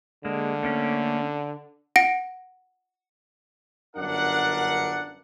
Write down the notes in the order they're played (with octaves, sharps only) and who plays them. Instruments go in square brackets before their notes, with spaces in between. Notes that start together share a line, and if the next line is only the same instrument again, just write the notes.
[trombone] D3 [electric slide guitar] G#3 A#3
[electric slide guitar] A3 A#3 C#4
[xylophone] F#5 A#6 D7
[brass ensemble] G1 F#2 D4 A#4 F#5